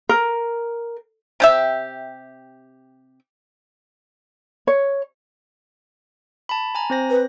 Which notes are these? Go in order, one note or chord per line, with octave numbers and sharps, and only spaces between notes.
A#4
C3 G4 E5
C#5
A5 B5
G#5 A#5
C4 C5 A#6
B4